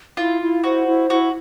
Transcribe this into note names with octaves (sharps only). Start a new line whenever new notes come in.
E4 F4
E4
F#4 C5
E4
E4 F#4